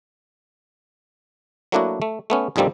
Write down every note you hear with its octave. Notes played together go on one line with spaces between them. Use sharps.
F#3 A3 A#3 D4 E4 F#4
A3
A3 B3 C#4
A#1 F2 D#3 G3 A#3 C4